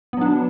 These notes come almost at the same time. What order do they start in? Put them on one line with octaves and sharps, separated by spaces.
B3 F#3 D4